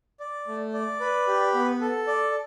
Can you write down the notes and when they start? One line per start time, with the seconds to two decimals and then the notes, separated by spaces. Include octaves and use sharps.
0.20 D5
0.47 A3
0.74 D5
1.00 B4
1.27 G4
1.54 B3
1.81 A4
2.07 D5